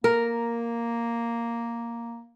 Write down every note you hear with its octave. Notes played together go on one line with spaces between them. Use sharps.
A#3 A#4